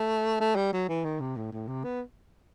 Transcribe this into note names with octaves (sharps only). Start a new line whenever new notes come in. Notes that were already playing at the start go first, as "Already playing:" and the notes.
Already playing: A3
A3
G3
F#3
E3
D#3
C3
A2
A2
C3
B3